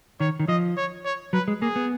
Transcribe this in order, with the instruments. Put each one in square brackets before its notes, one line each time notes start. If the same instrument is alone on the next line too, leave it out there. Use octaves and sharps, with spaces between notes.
[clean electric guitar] D#3 [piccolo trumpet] C#5
[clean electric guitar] D#3
[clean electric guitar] F3 [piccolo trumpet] D#5
[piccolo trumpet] C#5
C#5
[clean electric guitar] F#3 [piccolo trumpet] B4
[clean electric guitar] G#3
[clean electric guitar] A#3 [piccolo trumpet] G#4
[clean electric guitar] B3